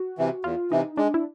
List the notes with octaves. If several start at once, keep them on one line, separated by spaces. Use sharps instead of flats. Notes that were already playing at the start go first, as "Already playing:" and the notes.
Already playing: F#4
C3 E3
E2 F4
C3 E3 D#4
G#3 D4
E4